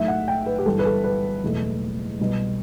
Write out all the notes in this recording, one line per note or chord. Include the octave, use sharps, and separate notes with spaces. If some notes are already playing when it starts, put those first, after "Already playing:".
Already playing: B1 A2 F#3 A3 E5
F#5
G5
B4
G4
G1 G2 E3 A4
B4
A4
B4
F#1 E2 B2 A3
C2 B2 G3